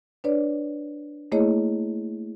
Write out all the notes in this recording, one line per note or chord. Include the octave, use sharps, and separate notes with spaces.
D4 B4 C#5 D5
A3 A#3 E4 G#4 C#5 D#5